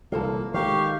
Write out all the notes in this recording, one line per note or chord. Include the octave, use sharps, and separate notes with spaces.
C2 E3 F3 A#3 F4 A4 A5
D#3 G3 G#3 G4 F5 C#6